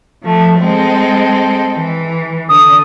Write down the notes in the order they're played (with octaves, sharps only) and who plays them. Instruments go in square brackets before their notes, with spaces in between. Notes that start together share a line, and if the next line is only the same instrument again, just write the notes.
[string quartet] F3 A3
G#3 C4 A4
E3
[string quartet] D3 [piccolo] D#6